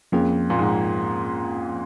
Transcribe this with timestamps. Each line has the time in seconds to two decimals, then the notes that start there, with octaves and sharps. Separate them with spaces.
0.12 F2 F3 A#3 C#4 G#4
0.50 A#2
0.59 G#2